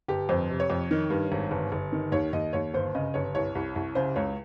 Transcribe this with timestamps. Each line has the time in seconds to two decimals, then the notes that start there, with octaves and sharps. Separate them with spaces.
0.08 G1 G4
0.29 F2 C5
0.50 C3
0.60 C#5
0.70 F2
0.91 D#3
1.10 G2
1.32 G#1
1.51 G1
1.72 G1
1.92 D#3
2.12 D#2 C#5
2.33 D#2 D#5
2.53 D#2 C#5
2.74 G1 C5
2.95 C#3 D#5
3.14 G1 C#5
3.35 C2 C#5
3.55 C2
3.76 C2
3.95 C#3 C5
4.16 C#2 C#5